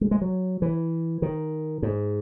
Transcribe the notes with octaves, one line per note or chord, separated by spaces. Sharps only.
G#3
G#3
F#3
E3
D#3
G#2